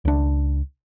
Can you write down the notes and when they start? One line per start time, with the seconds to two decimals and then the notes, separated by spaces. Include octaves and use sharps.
0.05 C#2 D4